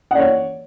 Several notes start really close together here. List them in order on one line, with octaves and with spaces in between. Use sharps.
F#5 D5 C#5